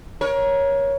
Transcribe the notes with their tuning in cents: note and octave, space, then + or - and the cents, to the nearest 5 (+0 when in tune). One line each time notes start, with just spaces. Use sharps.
A#4 +25 C#5 +0